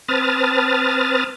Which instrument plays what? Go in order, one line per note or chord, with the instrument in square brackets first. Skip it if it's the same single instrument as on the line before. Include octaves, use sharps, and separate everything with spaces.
[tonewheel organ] C4 B4 A5 D#6 F6 A6